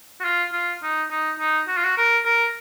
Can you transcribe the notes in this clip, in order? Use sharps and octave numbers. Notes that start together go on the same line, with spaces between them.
F#4
F4
F4
D#4
D#4
D#4
F#4
F4
F#4
A#4
A#4